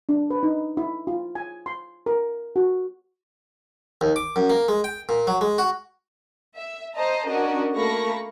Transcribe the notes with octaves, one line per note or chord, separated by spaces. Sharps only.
D4
B4
D#4
E4
F4
G#5
C6
A#4
F#4
D#2
D6
F#2
A#3
G#3
G5
A#2
F#3
G#3
F#4
E5
C5 D#5 A5 A#5
C#4 D4 F#4 A#4 D#5
A3 A#3 F5 B5 C#6 A#6